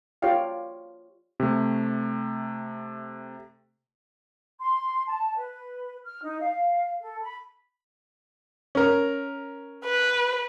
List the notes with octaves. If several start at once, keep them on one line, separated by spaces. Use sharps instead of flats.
F4 G4 C#5 D5 F5 G5
C3 A3
C6
A5
B4
F6
D#4
F5
A4
B5
C#4 A#4
B4